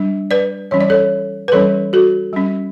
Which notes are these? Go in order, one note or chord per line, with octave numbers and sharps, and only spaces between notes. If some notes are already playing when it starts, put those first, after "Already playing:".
Already playing: G3 D4
B4 D5
E3 G3 C#4 C#5
D5
A4 C#5
B4
E3 G3 C#4 A4 C#5
F#4 A4
G3 C#4